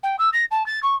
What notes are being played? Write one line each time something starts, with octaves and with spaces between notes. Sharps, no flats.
G5
E6
A#6
A5
A6
C#6